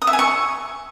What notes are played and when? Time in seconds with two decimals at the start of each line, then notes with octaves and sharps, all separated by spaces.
0.02 D#6
0.07 E5
0.13 G#5
0.19 C#6